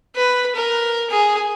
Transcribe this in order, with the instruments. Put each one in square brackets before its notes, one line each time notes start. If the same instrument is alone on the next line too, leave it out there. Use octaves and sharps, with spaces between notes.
[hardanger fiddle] B4
A#4
G#4